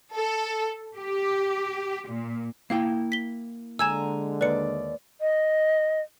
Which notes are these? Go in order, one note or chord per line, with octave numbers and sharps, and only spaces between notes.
A4
G4
A#2
A#3 E4 F5 G5
B6 G7
D3 G#3 G#5 A#5 E6 G#6 E7
D#2 B4 D5 C#7
D#5